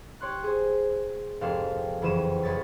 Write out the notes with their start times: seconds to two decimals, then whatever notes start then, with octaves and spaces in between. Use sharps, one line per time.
0.21 G4 C#5 C6 F#6
0.43 G#4 C5
1.41 F1 G#2 C4 A4 F5
2.02 F#1 F2 E3 F3 D#7 E7
2.42 B1 C#5 D#6 A6 B6 D#7